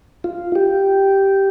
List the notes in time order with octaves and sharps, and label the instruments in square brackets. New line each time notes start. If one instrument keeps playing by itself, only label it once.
[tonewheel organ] F4
G4